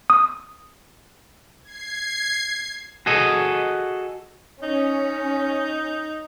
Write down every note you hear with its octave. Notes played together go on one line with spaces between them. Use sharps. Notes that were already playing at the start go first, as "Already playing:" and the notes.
D#6
G#6 C7
F#4 G#4 A4 D#5
C#4 D#4